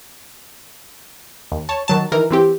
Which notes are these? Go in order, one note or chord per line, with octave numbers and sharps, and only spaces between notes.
D#2
C#5 A5
D#3 F#3 A5
D#3 E3 A#4
E3 C4 G4